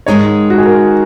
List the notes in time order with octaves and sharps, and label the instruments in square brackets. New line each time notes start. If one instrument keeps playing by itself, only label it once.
[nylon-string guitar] G#2 D#3 G#3 D#4 [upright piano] C#5
[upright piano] F#4
G#4
A#4